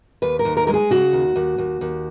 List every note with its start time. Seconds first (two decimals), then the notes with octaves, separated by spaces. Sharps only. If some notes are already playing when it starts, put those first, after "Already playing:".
0.22 D#2 B4
0.39 A#4
0.45 D#2
0.57 A#4
0.67 G#3 A#4
0.74 G#4
0.91 C#3 F#4
1.13 D#2
1.36 D#2
1.58 D#2
1.81 D#2